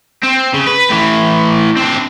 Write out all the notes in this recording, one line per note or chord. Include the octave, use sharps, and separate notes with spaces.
C4
C#3
B4
A2 E3
C4 D4